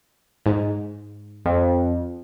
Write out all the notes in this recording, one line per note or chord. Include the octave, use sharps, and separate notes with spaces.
G#2
F2